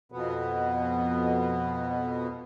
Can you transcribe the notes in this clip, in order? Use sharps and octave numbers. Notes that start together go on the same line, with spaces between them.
F2 B2 B3